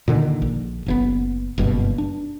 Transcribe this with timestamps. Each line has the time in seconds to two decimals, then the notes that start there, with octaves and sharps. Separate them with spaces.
0.08 A#2 D3 D#3
0.42 A#1
0.86 F#1 C#3 B3
1.58 F#1 G2 B2
1.98 D4